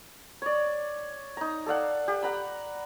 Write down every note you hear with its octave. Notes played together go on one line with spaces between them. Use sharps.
C#5 D5
D#4 A#5
A4 D5 F5 F#5
G4
F#5 A#5 B5